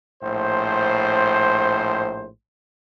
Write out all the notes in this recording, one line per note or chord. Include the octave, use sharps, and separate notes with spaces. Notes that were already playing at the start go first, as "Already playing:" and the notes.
A#1 A2 C5